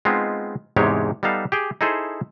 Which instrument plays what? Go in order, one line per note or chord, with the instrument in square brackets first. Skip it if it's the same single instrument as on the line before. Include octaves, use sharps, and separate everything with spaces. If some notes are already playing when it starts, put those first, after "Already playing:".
[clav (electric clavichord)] G#3 B3 C4 D#4 F4
E2 G#2 C3 G#3 G4 C#5
G3 B3 D#4 A4 F5
G4 G#4 G5
D#4 E4 G#4 A4 C5